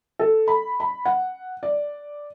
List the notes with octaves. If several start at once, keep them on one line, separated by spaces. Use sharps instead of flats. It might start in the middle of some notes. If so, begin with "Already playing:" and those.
A4
B5
B5
F#5
D5